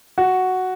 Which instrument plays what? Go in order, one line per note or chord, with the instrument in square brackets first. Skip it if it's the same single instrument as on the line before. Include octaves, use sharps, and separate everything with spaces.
[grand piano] F#4